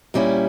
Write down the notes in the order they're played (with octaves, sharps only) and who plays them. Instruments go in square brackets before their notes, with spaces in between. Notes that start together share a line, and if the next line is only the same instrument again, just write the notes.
[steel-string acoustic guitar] A#2 G3 C#4 E4